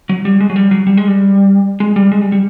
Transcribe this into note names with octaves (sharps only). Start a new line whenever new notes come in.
F#3
G3
G#3
F#3
G3
F#3
G3
G#3
G3
G#3
G3
G#3
G3
G3